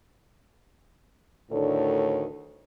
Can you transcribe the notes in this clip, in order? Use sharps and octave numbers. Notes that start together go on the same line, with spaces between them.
D2 A2 D#3 D4 A4 C#5